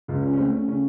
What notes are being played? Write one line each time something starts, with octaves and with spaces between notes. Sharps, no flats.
C#2 F4
C#4
C#4
A3 C4
C#4
C#3 C#4